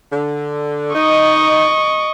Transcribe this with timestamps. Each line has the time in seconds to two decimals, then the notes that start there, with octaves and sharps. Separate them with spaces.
0.12 D3
0.94 D#4 D#5 C#6